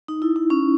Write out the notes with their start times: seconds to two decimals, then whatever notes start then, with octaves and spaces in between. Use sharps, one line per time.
0.08 D#4
0.22 E4
0.36 D#4
0.50 C#4